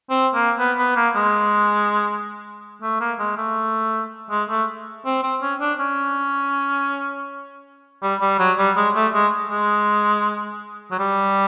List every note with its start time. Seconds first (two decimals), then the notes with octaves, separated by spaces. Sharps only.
0.10 C4
0.34 A#3
0.59 B3
0.78 B3
0.96 A#3
1.16 G#3
2.82 A3
3.00 A#3
3.19 G#3
3.37 A3
4.31 G#3
4.50 A3
5.05 C4
5.23 C4
5.42 C#4
5.60 D4
5.80 C#4
8.03 G3
8.21 G3
8.39 F#3
8.58 G3
8.76 G#3
8.95 A3
9.14 G#3
9.51 G#3
10.91 F#3
10.99 G3